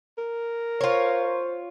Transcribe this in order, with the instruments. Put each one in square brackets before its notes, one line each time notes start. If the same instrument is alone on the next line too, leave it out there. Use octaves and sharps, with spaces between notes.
[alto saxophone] A#4
[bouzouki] F4 C#5 [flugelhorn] C5